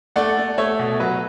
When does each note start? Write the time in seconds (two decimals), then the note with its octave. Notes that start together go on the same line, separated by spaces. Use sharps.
0.16 A3 D5 F#5
0.37 A3
0.58 A3 C#5 E5
0.79 B2
1.00 F#3 B4